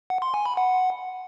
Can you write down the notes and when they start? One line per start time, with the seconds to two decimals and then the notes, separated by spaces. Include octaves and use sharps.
0.10 F#5
0.22 C6
0.34 G#5
0.46 B5
0.57 F#5